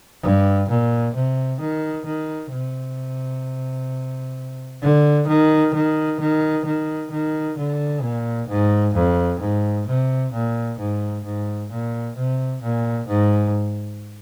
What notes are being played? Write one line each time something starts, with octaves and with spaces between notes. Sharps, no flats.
G2
A#2
C3
D#3
D#3
C3
D3
D#3
D#3
D#3
D#3
D#3
D3
A#2
G#2
F2
G#2
C3
A#2
G#2
G#2
A#2
C3
A#2
G#2